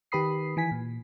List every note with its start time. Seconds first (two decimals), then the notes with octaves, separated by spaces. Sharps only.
0.12 D#3 G4 B4 B5 D#6 C7
0.56 D#3 E3 G#5 B6
0.71 A#2